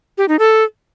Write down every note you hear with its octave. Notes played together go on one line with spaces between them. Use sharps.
G4
D#4
A4